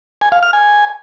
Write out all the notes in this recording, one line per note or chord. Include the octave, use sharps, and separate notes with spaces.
G#5
F5
F6
G#5